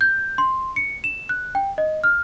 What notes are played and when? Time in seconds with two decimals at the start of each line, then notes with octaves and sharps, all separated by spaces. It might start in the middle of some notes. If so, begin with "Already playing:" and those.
0.01 G6
0.38 C6
0.76 C#7
1.04 E7
1.29 F#6
1.55 G5
1.78 D#5
2.04 F6